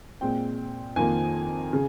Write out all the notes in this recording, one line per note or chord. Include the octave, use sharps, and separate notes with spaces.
A#2 G#3 C4 G5
F2 D#3 A#3 F4 G#5
C#3